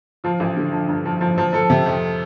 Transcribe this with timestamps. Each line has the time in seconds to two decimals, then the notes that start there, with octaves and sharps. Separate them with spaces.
0.24 F3 F4
0.40 A1
0.57 D3
0.72 F3
0.88 G2
1.05 F3
1.21 F3
1.38 F3
1.53 F3 A4
1.70 C3
1.86 F2